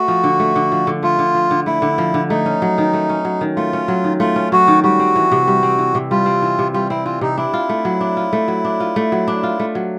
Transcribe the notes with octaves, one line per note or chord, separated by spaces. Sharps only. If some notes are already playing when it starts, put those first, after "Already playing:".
Already playing: A3 F#4
F3
D3
A3
D3
F3
D3
A3 F4
D3
F3
D3
A3 E4
D3
F3
D3
A3 D#4
C#4
F#3
D#3
A3
C#4
F#3
D#3
A3 F4
C#4
F#3
D#3
A3 F4
C#4
F#3 F#4
D#3
G3 F#4
C4
E3
C3
G3
C4
E3
C3
G3 F4
C4
E3
C3
G3 F4
C4 E4
E3 F4
C3 D#4
D4 E4
F4
A3
F#3
D4
F4
A3
F#3
D4
F4
A3
F#3
D4
F4
A3
F#3